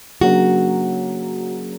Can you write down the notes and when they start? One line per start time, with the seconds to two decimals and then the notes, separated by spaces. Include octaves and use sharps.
0.21 C#3 F#3 A#3 D4 F#4